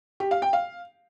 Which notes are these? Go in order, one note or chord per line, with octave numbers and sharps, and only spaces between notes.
G4
F5
G5
F5